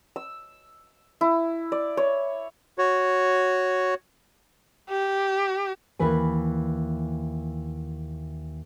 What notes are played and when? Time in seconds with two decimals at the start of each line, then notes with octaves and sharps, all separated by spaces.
0.16 E6
1.21 E4
1.72 D5
1.97 C#5
2.78 F#4 C#5
4.89 G4
5.99 D#2 E3 B4 G#5